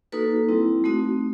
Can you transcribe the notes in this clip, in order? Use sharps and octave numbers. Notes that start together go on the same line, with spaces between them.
A#3 D#4 F#4 A4 B4
G3 C4 E4
A3 C4 D#4 F#4